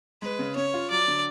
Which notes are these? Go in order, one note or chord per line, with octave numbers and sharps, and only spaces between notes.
G#3 B4
C#3
C#4 C#5
F4
F#3 D5
D3